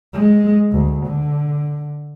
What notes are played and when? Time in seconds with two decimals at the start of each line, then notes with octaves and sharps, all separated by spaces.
0.14 G#3
0.71 D2
1.06 D3